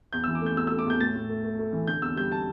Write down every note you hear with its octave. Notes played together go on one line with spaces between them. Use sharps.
E2 G6
E3 E6
D6
A3 G6
E2 E6
A3 E6
D6
E2 G6
A2 A6
A2
A3
A3
A3
E3
D3 G6
E2 E6
G3 G6
A5